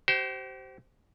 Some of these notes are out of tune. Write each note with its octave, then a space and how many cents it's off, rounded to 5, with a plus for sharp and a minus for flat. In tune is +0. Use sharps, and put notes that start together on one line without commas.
G4 -40 C5 +0